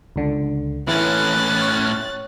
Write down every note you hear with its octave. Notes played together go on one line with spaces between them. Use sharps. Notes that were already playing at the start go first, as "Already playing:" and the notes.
C#2 D3
A2 E3 C#4 F#6 A6
C#5